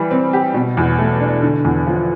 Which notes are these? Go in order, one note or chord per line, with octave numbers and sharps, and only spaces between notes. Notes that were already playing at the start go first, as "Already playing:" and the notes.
Already playing: E3 G3
C4
G4
B2
E2
A3
D4
D3
E2
F3